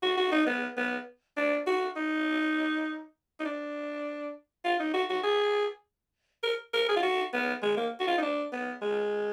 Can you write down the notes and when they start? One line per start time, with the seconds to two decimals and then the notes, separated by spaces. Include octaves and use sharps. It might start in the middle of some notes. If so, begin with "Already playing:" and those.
0.03 F#4
0.17 F#4
0.32 D#4
0.47 B3
0.77 B3
1.37 D4
1.67 F#4
1.96 D#4
3.40 D#4
3.45 D4
4.65 F4
4.79 D#4
4.94 F#4
5.10 F#4
5.23 G#4
6.43 A#4
6.74 A#4
6.89 G#4
6.96 F4
7.03 F#4
7.33 B3
7.62 G#3
7.77 A#3
8.00 F#4
8.07 F4
8.17 D#4
8.22 D4
8.53 B3
8.82 G#3